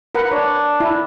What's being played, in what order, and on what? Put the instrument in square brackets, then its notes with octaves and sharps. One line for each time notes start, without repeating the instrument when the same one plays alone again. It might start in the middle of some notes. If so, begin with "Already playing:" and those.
[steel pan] A#4 B4 F#5
[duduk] D4 [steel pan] C#5
[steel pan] E4